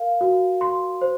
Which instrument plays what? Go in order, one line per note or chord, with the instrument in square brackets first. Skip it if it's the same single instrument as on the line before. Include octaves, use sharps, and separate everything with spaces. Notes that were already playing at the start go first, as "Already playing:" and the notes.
Already playing: [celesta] A#4 F5
F#4
C6
C5